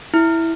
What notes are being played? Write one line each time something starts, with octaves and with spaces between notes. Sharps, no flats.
E4